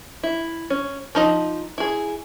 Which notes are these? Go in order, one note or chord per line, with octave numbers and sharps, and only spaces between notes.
E4
C#4
F3 D#4 D#5
E4 G#4